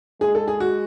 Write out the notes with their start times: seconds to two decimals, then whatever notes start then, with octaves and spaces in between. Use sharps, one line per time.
0.21 G#3 G#4
0.35 A4
0.48 G#4
0.60 F#4